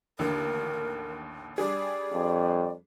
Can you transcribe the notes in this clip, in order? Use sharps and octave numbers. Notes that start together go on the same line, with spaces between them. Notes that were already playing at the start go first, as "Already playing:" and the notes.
A1 D#2 D3 A#4
G3 D4 G#4 D5
F2